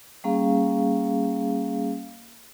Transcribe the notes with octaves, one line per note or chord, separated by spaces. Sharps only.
G3 A#3 C#4 G#4 F5